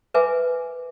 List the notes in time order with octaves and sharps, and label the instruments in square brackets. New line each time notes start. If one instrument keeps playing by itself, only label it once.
[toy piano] A#4 B4 E5 G#5 D6